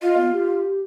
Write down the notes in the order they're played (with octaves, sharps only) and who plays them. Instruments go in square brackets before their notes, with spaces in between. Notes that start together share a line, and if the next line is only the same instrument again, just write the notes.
[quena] F4 [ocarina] D#5
[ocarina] B3
G4